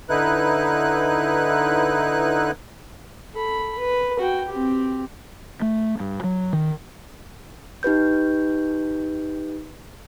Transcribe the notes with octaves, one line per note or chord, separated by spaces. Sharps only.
D3 D#4 E4 B4 F#6
A4 B5
B4
F#4 G5
C4 G4
A3
G2
F#3
D#3
D#4 G4 B4 G6